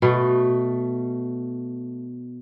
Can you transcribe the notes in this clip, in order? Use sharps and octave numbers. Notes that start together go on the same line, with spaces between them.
B2 A3